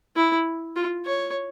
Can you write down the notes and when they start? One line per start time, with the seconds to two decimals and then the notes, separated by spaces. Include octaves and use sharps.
0.16 E4
0.76 F4
1.06 C#5